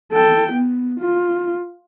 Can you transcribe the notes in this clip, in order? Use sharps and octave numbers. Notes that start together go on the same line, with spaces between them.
A4 G5
B3
F4